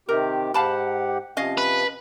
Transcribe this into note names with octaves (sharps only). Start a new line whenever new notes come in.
C3 D#3 G4 A#4
G#2 G4 F5 F#5 A5 B5
C3 F3 C#4 D#5 F5
B4